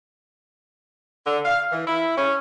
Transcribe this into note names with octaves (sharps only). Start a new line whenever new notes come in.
D3
F5
E3
E4
C#4